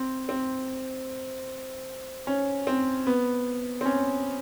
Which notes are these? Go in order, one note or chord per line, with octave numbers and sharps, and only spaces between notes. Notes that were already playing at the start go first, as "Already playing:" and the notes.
Already playing: C4
C4
C#4
C4
B3
C4
C#4